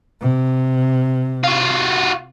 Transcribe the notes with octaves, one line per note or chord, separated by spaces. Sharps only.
C3
F4 F#4